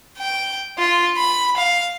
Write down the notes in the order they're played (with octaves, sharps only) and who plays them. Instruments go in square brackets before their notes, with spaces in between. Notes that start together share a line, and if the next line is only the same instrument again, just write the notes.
[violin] G5
F4
B5
F5